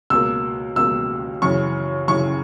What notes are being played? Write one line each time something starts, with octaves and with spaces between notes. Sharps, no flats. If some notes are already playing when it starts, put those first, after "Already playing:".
C#2 B2 A#3 E6
C#2 B2 A#3 E6
F#2 C#3 E3 C#6
F#2 C#3 E3 C#6